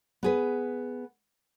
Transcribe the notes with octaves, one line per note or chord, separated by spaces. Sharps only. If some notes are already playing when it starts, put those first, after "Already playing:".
B3 G#4 B4